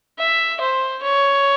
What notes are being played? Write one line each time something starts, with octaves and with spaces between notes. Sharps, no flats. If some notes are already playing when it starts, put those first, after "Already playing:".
E5
C5
C#5